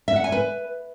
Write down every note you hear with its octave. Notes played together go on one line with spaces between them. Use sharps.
E5
F#5
G#5
B4